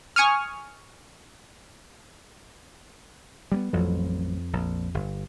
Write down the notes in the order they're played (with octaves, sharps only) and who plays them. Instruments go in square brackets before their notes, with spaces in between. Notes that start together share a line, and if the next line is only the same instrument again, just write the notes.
[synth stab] G#5 C#6 D#6 F6
[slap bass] G3 A#3 B3
[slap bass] A1 F#3 [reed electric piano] F2
[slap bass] A#1
G1